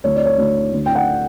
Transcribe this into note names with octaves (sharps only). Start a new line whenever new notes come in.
D2 C#5
D5
C#5
D2
D2
G5
F#5